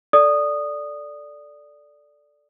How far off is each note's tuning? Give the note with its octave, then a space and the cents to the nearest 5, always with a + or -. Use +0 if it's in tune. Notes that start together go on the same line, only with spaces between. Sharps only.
A4 +0 D5 +0 D#6 -15